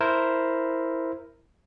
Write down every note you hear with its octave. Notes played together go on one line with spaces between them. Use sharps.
E4 A#4 C5